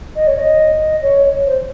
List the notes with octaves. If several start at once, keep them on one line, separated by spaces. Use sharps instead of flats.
D#5
C#5
D#5
C#5
C5